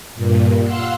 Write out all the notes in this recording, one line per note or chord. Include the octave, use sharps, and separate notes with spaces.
G2 A#2
F5 F#5 C6 E6 F#6